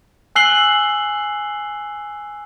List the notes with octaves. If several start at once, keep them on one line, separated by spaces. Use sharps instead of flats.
G#5 E6 F#6 C7 F#7 G7